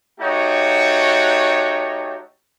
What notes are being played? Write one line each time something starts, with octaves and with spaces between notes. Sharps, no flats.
A3 D#4 F#4 G4 C#5